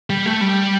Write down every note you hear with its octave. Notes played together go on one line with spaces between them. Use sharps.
G3
A3
G3